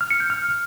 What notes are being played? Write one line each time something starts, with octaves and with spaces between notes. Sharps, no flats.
F6
C#7
G6
F6